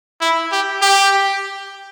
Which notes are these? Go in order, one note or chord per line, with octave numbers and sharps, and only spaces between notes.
E4
G4
G4